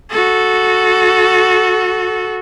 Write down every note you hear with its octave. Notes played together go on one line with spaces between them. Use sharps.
F#4 A4